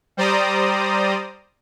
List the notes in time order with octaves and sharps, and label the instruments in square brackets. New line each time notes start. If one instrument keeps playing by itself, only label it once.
[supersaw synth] G3 C5 D5 A#5 D#6